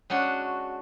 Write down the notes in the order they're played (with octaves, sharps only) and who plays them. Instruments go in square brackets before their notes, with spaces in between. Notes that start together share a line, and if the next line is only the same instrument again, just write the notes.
[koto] G#3 C#4 D4 F#4